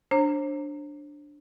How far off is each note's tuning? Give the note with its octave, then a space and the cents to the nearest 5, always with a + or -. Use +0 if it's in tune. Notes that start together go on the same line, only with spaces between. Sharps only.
D4 +0 C5 +35 A#5 -20